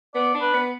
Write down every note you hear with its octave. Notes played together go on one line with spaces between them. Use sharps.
B3 D5
D4
B4
B3